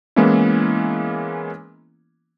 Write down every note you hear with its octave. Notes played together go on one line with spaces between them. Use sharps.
E3 G#3 A#3 B3 C#4 E4